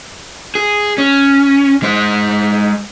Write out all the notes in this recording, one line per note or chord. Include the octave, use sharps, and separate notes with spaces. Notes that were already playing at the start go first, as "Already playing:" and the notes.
G#4
C#4
G#3 C5